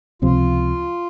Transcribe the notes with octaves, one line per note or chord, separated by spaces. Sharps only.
C#2 C3 F3 C4 F4